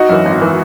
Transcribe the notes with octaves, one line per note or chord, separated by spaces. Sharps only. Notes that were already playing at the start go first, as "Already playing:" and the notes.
Already playing: D#4 F#4
F#2 E3
G#1
E3